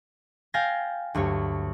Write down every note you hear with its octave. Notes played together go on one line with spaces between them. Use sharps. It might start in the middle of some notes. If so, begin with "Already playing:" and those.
F5 G5 G#5 G6 A6 A#6
D2 G2 F#3 C#5